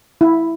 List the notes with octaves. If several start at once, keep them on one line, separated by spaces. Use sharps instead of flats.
E4